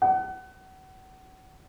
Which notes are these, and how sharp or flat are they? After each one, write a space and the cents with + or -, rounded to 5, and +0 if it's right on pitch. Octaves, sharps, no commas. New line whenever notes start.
F#5 +30